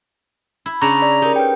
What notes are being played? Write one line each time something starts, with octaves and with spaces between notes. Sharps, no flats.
E4
C#3 D4 A#5 C#6
D5 B5
D#4 G4 A#4
B4 C#5 G5